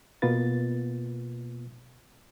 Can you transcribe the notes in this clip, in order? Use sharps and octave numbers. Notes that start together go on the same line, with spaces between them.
B2 A#3 B3 F4 B4 A6